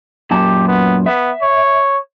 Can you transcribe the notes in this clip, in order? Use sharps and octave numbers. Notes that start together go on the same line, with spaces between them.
F#2 A#2 G4 A5
B3
B3 E5
C#5